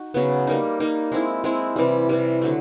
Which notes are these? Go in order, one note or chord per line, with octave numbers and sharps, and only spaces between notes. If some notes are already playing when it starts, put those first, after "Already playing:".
Already playing: D#4 F#4
C#3 F#3 B3
G3 A#3 D#4
G3 A#3 D#4
G#3 C4 E4
G#3 C4 E4
C3 E3 G3
C3 E3 G3
D3 F#3 A3